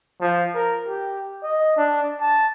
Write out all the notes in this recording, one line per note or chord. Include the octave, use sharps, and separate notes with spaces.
F3
A#4
G4
D#5
D4
A5